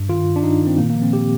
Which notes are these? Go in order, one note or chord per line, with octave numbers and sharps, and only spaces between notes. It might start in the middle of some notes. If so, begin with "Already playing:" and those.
Already playing: G2
D#3 F4
D#3
D4
D#3 D#4
D#3
C4
A#2 A#3
A#3
F3
C4
A#2 G4